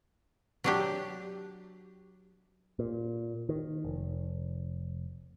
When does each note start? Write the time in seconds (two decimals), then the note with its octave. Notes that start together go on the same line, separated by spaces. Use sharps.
0.64 F#3 D4 G4
2.79 A#2
3.49 D#3
3.85 F1